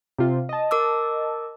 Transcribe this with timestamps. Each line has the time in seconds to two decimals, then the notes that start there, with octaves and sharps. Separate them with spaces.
0.19 C3 F4
0.49 D#5 A5
0.71 A#4 D6 E6